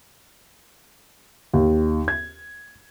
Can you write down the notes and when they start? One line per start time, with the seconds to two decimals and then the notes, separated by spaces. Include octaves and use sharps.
1.54 D#2
2.08 G#6